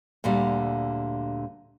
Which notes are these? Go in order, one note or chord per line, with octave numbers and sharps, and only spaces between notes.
D2 A#2 D3 G3